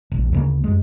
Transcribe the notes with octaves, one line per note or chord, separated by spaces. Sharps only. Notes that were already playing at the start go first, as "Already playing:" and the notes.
E1 A#1
D2 C#3 A#3
F#2 G#3